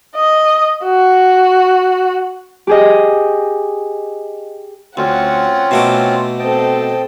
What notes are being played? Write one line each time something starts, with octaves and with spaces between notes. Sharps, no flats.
D#5
F#4
G4 G#4 D#5
D2 C4 C#4 F4 F#5
B2 A3 D6
C4 A4 D#5 G5 A5